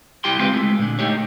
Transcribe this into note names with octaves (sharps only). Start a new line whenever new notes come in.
C2 G3 E4 G4 G5 C6
C#3 G#3 C4 F4 G4 B4
G#3 A3
A#2 D3
A3 D#4 G4 C#5